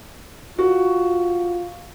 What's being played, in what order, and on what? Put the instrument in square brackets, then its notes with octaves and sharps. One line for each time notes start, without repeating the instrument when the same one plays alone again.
[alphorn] F4 [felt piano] F#4